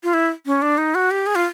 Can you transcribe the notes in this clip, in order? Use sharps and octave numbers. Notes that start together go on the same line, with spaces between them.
F4
E4
C#4
D4
D#4
F#4
G4
G#4
F4